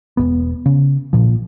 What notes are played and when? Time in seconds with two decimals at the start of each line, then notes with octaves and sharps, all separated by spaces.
0.17 E1 D#2 B3
0.66 C#3
1.13 A#2 F3